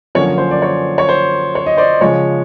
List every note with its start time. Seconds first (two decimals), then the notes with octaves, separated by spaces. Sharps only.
0.15 F#2 D3 F3 A#3 C#4 C#5
0.38 C5
0.51 D5
0.62 C#5
0.98 C#5
1.09 C5
1.55 C#5
1.66 D#5
1.77 C5 D5
2.01 C#3 F3 G#3 C#5